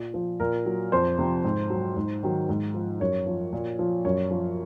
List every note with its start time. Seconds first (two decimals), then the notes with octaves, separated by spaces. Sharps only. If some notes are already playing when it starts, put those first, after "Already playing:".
Already playing: A#2
0.14 F3
0.40 A#2 A#4
0.66 F#3
0.92 F2 C5
1.19 C3 F3
1.44 G#2
1.70 F#3
1.97 G#2
2.23 D#3 F#3
2.49 G#2
2.74 F3
3.00 F#2 C#5
3.27 F3
3.53 A#2
3.79 F3
4.05 F#2 C#5
4.31 F3